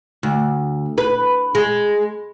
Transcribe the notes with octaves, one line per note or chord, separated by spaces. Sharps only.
D2
B4
G#3